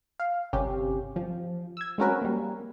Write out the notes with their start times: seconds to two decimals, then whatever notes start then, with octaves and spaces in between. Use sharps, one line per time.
0.20 F5
0.53 G1 C3 C#4 G4
1.16 F3
1.77 E6 G#6
1.98 G#3 C4 C#4 F#4 A#4 B4
2.22 G3 A#3